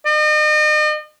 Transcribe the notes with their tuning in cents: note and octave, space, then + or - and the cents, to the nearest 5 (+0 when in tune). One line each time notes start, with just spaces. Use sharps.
D#5 -40